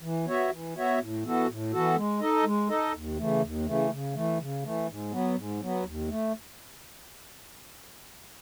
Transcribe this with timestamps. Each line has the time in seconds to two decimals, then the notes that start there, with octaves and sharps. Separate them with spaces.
0.01 E3
0.25 B3 F#4 C#5 E5
0.50 E3
0.75 B3 F#4 C#5 E5
0.99 A2
1.23 E3 B3 F#4 A4
1.48 A2
1.72 E3 B3 F#4 A4
1.96 G#3
2.20 D#4 A4 D#5
2.44 G#3
2.69 D#4 A4 D#5
2.94 D#2
3.18 C#3 E3 A3
3.41 D#2
3.66 C#3 E3 A3
3.91 C#3
4.14 E3 A3
4.39 C#3
4.63 E3 A3
4.88 G#2
5.11 F#3 B3
5.36 G#2
5.60 F#3 B3
5.85 D#2
6.08 A3